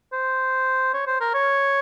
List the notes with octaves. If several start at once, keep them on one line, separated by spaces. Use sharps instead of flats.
C5
C#5
C5
A#4
C#5